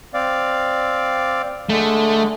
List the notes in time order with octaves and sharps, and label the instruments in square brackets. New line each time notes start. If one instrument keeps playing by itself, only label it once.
[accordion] C4 D5 F5
[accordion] D3 G#3 [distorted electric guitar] A3